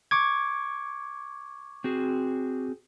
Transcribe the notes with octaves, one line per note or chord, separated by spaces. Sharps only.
C#6 D6 G#6
C4 F#4 G#4